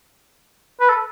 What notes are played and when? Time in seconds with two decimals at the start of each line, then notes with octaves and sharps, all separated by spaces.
0.80 B4
0.89 A4